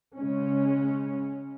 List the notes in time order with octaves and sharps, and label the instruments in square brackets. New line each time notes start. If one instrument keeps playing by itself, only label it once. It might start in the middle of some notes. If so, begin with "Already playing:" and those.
[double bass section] C#3 G#3 C#4